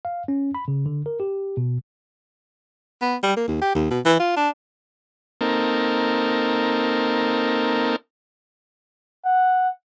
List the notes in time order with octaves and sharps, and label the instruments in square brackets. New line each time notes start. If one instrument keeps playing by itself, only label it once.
[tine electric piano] F5
C#4
B5
C#3
D3
A#4
G4
B2
[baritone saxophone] B3
G3
A#3
D#2
G4
D#2
B2
E3
F4
D4
[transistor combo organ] A#3 C4 D#4 A4 A#4
[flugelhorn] F#5